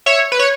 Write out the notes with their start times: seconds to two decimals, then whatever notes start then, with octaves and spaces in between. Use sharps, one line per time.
0.06 C#5 E5
0.32 B4
0.39 C#5